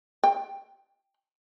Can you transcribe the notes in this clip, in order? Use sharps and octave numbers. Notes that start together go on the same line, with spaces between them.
G5